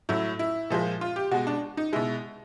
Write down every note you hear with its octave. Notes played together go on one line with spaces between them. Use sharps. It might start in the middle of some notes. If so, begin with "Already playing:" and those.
A2 F#3 E4
E4
A#2 F3 G#3
F4
G4
B2 G#3 F#4
D4
D#4
B2 G#3 E4